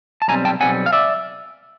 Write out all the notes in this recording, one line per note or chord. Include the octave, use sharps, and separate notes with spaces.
A5
B1 A#2 G3 C4 G#5 A#5
G5 A5
B1 A#2 G3 C4 F#5 G#5
F5
D5 E5